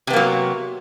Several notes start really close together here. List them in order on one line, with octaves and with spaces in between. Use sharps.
C3 B3 A#3 F#3